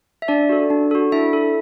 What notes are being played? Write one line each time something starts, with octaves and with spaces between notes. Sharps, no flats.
E5
D4 D5
F#4 A4
D4
F#4 A4
D4 E4 E5
A4